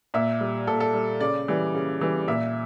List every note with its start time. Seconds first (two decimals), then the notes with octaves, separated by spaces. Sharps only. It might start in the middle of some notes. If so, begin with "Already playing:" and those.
0.14 A#2 E5
0.41 G3
0.67 A#2 A4
0.80 A4
0.94 G3
1.20 C#3 D5
1.48 E3 G3
1.74 C#3
2.01 E3 G3
2.28 A#2 E5